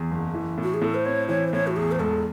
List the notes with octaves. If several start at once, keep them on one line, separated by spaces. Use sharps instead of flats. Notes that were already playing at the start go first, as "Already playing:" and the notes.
Already playing: E2
F#1
E3
A2
F#4
G#4
A2 A4
C5
C4 C#5
E3 C#5
C5
A2 C#5
F#4
E2 G#4
C5
E1 A4